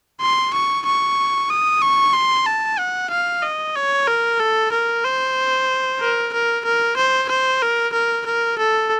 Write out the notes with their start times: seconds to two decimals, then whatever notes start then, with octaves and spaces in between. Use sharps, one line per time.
0.21 C6
0.53 C#6
0.86 C#6
1.50 D#6
1.82 C#6
2.14 C6
2.46 A5
2.79 F#5
3.10 F5
3.42 D#5
3.76 C#5
4.07 A#4
4.40 A4
4.72 A#4
5.04 C5
6.00 A#4
6.33 A#4
6.65 A#4
6.97 C5
7.29 C5
7.62 A#4
7.93 A#4
8.26 A#4
8.58 A4